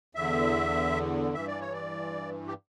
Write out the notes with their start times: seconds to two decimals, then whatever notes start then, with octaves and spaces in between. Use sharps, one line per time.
0.15 E2 D3 E5
1.34 G2 E3 E5
1.47 D5
1.60 C#5
1.73 D5
2.47 G4